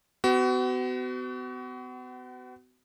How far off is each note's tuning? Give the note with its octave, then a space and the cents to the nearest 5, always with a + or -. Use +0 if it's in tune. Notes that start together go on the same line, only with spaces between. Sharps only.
B3 +40 F#4 +30